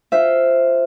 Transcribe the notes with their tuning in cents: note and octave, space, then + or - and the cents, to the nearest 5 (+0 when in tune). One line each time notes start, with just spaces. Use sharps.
F4 +0 C5 +0 E5 +0